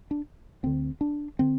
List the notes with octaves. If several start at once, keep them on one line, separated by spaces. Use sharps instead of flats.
D4
D2 D3 C4
D4
D3 C4